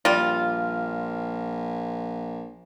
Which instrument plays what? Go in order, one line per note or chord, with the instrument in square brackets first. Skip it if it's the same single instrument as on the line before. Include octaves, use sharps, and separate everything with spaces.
[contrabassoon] A#1 [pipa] G3 F4